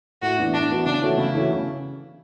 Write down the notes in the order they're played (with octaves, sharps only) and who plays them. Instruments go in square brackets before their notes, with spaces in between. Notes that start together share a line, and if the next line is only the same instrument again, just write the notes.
[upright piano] A2 [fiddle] F#4
[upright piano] E3 B3 D4 F#4
[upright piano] A2 [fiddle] D4
[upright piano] E3 B3 D4 F#4
[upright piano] C#3 [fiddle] D4
[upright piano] E3 A3 C#4 F#4
[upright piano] C#3 [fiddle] E4
[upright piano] E3 A3 C#4 F#4
C#3